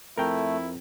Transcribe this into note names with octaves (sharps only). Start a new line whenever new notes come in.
F2 A3 E4 A#4 G5